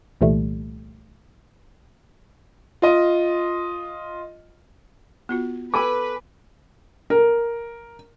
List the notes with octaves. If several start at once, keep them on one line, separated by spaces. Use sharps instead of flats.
C2 A#2 E3 G3 A3
F4 D#5
B3 F4 F#4
A4 B4 G#5 B5 D6
A#4